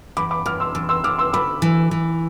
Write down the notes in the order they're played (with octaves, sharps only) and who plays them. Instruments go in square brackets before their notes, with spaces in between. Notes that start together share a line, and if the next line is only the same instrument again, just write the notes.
[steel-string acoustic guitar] E2 [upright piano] B5 D6
[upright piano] B5 D6
[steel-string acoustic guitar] E2 [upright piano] D6 F6
[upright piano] C6 E6
[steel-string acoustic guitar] E2
[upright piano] C6 E6
[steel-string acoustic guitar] E2 [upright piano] D6 F6
[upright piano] C6 E6
[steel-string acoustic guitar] D2 [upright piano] B5 D6
[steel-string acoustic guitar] E3
E3